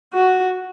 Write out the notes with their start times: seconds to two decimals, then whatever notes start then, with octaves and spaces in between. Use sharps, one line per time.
0.13 F#4